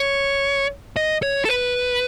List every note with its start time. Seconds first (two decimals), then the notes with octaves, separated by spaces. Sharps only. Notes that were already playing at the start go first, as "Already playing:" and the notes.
Already playing: C#5
0.96 D#5
1.23 C#5
1.45 A4
1.49 B4